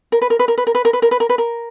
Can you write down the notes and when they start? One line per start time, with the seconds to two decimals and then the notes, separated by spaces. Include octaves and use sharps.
0.12 A#4
0.22 B4
0.30 A#4
0.39 B4
0.48 A#4
0.58 B4
0.67 A#4
0.75 B4
0.85 A#4
0.93 B4
1.02 A#4
1.11 B4
1.20 A#4
1.29 B4
1.38 A#4